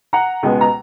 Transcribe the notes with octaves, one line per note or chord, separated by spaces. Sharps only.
F#5 A#5
C#2 B2 G#3 B3
A#5